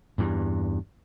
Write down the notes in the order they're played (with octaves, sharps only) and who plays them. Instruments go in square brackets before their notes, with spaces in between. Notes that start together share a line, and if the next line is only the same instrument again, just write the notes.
[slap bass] E2 G2